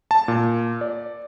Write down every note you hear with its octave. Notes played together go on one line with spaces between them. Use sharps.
A5
A#2
D5